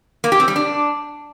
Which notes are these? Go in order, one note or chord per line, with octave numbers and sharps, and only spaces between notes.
A#3
G4
C4
G3
D4